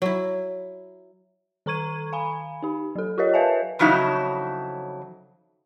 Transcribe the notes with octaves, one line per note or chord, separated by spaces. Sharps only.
F#3 E4
D#3 A4 A#5 C#6 G#6 D#7
F5 G#5 B5
D#4 G4
F#3 A4
F4 G4 A#4 C#5 D#5
B4 C#5 E5 F5 G#5 A5
F2 C#3 F#3 D#4 E4